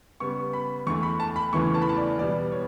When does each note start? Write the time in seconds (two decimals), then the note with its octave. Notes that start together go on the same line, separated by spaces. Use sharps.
0.20 C#3 G3 B3 C#6
0.53 B5
0.87 E2 D3 A3 C#6
1.03 B5
1.20 A5
1.36 B5
1.53 E2 C#3 E3 A3 C#6
1.75 A5
1.82 B5
1.89 A5
1.97 D5
2.19 E2 B2 G3 B3 D5
2.52 C#5